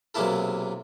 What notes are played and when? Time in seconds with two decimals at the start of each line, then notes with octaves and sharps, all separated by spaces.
0.15 B1 C3 G#3 A#3 E4 A4